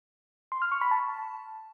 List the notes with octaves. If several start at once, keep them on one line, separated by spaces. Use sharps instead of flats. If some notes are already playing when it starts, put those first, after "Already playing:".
C6
F6
C#6
B5
A5